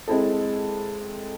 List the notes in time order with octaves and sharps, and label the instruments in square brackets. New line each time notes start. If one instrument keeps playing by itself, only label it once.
[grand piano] G#3 C4 E4 A4